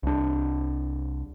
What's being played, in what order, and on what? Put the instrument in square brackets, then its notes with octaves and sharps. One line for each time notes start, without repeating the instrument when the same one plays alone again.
[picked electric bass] C2 D4